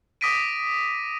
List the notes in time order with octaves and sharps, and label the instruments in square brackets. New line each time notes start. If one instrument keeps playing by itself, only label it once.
[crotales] D6 D#6 A#6 B6 D7 D#7